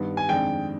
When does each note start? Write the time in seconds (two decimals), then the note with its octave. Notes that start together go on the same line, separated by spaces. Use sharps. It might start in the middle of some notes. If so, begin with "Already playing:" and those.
Already playing: G2 D#3 B3
0.17 G#5
0.29 F2 D#3 G#3 D4 G5